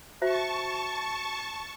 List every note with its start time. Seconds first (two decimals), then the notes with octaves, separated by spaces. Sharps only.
0.22 F#4 C5 E5 A5 C#6